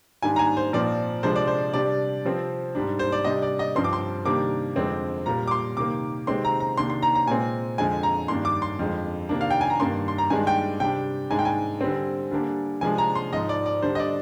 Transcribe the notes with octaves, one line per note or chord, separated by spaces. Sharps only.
G#2 D#3 G3 D4 G#5
A#5
G#5
C5
A#2 F3 C4 D5
C3 F3 G#3 D4 C5
D5
C5
C3 G3 D4 D5
C3 F3 C4
G#2 G3 D4
C5
D5
C3 G3 D4 D#5
D5
D#5
G2 F3 C4 C6
D6
C6
C3 D#3 G3 A#3 D4 D6
F2 D3 G#3 C4
A#2 G3 A#3 A#5
D6
C6
C3 D#3 A#3 D6
C3 D#3 G#3 C4 C6
A#5
A#5
C3 D#3 A#3 D4 C6
C6
A#5
A#5
A#2 G#3 C4 G#5
F2 D3 G#3 G#5
A#5
G2 D#3 A#3 D4 C6
D6
C6
F2 D3 G#3
C3 D#3 A#3 D4
F5
G5
G#5
A#5
G2 D#3 A#3 D4 C6
C6
A#5
G2 D#3 G#3 D4 G#5
G5
C3 G3 D4 G5
G#2 D#3 G#3 D4 G#5
G5
G#5
D3 G3 C4
D3 G3 A#3 D4
C3 F3 G#3 D4 G#5
A#5
C6
G#2 F3 G#3 D#5
D5
D5
D3 G3 D4 C5
D#5
D5